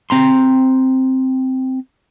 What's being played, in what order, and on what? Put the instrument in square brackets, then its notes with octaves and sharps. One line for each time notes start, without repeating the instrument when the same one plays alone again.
[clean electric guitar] C4 A#5 C6